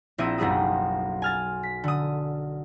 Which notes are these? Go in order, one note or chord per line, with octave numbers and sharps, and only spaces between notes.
A#1 C4 E4 E5 D#6 D#7
F#1 B1 G3 B3 G#4 D#6
G#5 F6 A6
B6
D3 D#6